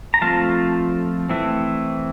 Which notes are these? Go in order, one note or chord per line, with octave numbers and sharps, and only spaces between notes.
A#5
F3 A3 C4 F4 F5 A5
E3 A3 C4 E4